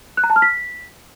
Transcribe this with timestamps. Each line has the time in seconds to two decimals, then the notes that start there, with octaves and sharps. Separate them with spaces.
0.17 F#6
0.24 A#5
0.30 A5
0.36 F6
0.42 B6